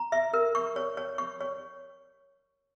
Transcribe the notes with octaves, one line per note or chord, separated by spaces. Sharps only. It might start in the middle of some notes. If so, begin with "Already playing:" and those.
Already playing: A#5
E5
A#4
C#6
C#5
C#5
C#6
C#5